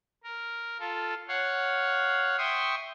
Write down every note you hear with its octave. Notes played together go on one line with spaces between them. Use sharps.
A#4
F4 A4
C#5 F5 F#5
E5 G5 C6 C#6 D#6